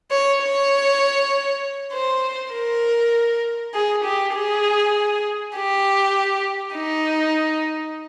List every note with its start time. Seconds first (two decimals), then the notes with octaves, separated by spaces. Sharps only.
0.11 C#5
0.42 C#5
1.93 C5
2.53 A#4
3.74 G#4
4.05 G4
4.35 G#4
5.56 G4
6.76 D#4